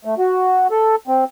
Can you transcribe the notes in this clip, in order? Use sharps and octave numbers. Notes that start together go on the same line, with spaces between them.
A3
F#4
A4
C4